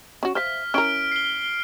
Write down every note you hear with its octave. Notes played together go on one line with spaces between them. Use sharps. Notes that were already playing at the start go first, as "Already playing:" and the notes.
C#4 F#4
C5 E5 F5 F6 B6
C#4 E4 A#4 F6 D7
C7 G7